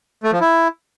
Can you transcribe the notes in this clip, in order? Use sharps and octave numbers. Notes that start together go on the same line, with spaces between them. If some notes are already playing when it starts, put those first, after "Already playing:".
A3
F3
E4